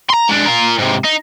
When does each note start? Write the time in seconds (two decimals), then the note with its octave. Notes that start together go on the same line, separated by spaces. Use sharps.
0.10 A#5 C6
0.29 G#3 D4
0.46 F4 A#4
0.79 G#2 C3
1.05 D#4